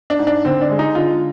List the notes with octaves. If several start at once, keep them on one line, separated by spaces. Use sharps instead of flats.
D4
G#2
D4
D3 C4
D4
G#3
D#4
D3 F4